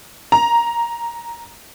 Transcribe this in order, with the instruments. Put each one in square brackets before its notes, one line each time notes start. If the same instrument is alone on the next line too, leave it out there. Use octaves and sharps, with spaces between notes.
[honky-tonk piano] A#5